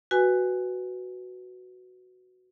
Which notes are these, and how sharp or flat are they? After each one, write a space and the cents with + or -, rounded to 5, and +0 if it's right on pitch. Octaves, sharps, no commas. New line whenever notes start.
F#4 +0 B4 +0 G#5 -10